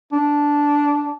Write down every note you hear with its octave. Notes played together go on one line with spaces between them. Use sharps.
D4